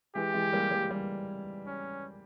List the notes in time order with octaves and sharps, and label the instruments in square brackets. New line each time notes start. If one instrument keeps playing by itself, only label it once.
[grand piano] E3 G#3 [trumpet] G4
[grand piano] E3 G#3
G3 A#3
G3 A#3
G3
[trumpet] C#4